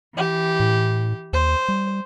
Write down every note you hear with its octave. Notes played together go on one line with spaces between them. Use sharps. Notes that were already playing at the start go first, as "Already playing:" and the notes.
E3 G4
A2
D#2 C5
G3